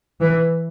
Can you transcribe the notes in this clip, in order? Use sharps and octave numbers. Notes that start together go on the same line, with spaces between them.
E3